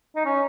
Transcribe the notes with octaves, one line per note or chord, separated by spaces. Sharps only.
D#4
C#4